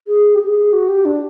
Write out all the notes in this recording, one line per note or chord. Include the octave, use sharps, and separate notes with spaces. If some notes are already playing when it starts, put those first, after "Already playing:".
G#4
G4
G#4
F#4
G4
D4